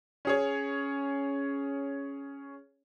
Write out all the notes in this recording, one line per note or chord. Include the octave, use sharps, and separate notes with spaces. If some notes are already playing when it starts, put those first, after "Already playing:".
C#4 G#4 C#5